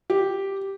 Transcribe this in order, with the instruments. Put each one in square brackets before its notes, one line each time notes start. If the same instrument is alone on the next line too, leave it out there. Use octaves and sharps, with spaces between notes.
[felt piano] G4